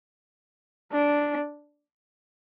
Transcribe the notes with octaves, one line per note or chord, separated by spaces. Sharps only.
D4